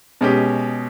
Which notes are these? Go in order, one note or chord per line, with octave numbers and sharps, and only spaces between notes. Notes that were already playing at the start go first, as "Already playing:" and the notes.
B2 G#3 C#4 G4